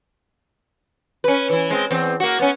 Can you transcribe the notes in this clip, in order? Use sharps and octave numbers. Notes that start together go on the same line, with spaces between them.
C#4 B4
E3 E4
G#3 C4
E2 C4
A#3 F#4
B3 C#4